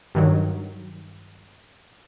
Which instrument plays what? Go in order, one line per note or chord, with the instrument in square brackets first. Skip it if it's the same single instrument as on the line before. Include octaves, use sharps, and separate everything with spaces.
[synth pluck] G2 D#3 F#3